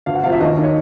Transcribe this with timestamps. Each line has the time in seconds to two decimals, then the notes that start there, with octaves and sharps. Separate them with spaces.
0.06 D2 F5
0.15 F#5
0.23 C3 F5
0.27 F3
0.32 E5
0.40 D#2 D#5
0.57 D#3
0.63 C#5